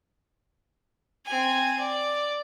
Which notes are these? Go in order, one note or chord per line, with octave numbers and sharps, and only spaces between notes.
C4 G#5
D5